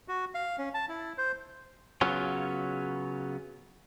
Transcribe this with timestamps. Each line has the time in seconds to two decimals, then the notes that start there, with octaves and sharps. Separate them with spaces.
0.08 F#4
0.35 F5
0.58 C#4
0.74 A5
0.89 E4
1.18 C5
2.01 C#3 F#3 B3 C#4 F4